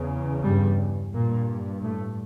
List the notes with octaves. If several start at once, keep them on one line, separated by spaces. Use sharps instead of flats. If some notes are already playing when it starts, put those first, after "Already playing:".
Already playing: E2 C#3
G2 G3
G2 A#2 A#3
A2 A3